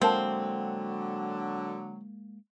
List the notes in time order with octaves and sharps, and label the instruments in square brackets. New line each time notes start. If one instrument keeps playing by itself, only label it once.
[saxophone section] D3 F#3 [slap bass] G#3 A#3 [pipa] C4 [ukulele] A#4 F5 A5